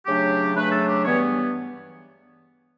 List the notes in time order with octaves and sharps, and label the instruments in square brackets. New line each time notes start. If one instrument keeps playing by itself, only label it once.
[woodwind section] C#3 F#3 A3 D4 G4
C#3 F#3 A3 D4 B4
A4
G4
G2 E3 G3 B3 C#5